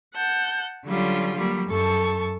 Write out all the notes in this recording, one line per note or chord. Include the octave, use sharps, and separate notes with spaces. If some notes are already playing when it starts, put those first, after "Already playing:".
F#5 A5 G6
D3 F#3 G3 C#4 F4
F#3 G3 A#3
F#2 A4 A5 C#6